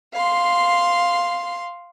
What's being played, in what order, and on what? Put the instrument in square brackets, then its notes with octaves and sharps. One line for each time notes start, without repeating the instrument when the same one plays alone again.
[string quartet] F5 C6